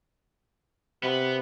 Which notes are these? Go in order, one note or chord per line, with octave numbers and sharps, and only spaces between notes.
C3 B3 B4